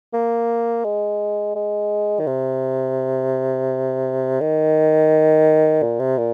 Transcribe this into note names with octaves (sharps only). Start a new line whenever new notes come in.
A#3
G#3
G#3
D#3
C3
D#3
A#2
C3
A#2